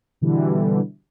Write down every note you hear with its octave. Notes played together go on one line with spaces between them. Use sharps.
B2 D3 E3 G3